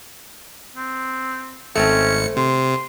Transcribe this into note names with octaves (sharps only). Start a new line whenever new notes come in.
C4
G#1 A3 C4 C#4 C#7
C3 C6